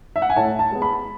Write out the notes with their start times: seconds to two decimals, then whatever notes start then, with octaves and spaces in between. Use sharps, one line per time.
0.16 E5
0.22 F#5
0.30 G#5
0.36 A2 A5
0.59 A5
0.71 G#3 B3
0.82 B5